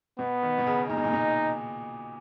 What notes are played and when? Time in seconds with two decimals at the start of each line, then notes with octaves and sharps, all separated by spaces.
0.19 B2 B3
0.43 D#3
0.58 B2
0.67 C#3
0.89 A#2 D#4
0.97 B2
1.04 A#2
1.13 B2